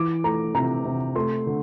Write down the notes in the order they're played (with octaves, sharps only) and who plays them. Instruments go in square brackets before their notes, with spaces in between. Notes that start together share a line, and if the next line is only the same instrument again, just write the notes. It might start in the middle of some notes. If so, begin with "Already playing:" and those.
Already playing: [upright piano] E3 D6
A3 A#5
C3 A#5
C3
A3 C6
D3